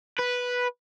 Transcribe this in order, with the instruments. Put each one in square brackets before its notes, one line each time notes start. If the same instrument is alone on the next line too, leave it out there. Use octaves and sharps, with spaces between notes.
[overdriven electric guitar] B4